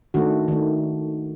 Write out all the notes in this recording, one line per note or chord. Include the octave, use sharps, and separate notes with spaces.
D#3 A3 D4 F#4
D#3 A3